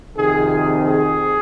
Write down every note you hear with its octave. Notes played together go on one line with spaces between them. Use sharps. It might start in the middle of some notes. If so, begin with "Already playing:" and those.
F2 C3 D#3 G#4
G#4